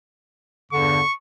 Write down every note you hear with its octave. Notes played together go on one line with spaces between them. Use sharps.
E2 G2 D3 C#6